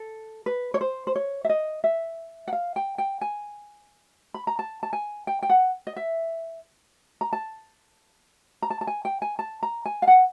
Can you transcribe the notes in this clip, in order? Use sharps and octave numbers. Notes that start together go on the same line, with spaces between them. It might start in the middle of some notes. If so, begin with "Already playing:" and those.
Already playing: A4
B4
C#5
C5
C5
C#5
E5
D#5
E5
F#5
F5
G5
G5
G#5
B5
A#5
A5
A5
G#5
G5
G5
F#5
D#5
E5
A#5
A5
A#5
A5
A5
G#5
G5
G#5
A5
A#5
G#5
F5
F#5